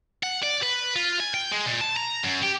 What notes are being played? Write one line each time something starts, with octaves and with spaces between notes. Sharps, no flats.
F#5
D5
B4
F4
G#5
G5
G#3
A#2
A5
A#5
F#2
G4